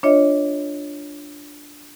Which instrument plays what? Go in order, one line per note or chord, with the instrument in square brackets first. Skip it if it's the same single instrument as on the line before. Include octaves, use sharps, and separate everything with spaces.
[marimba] D4 F4 C#5 D#5 E5